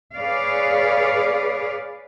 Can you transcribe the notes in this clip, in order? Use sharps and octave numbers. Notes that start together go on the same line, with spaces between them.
G#4 B4 C#5 D5 F5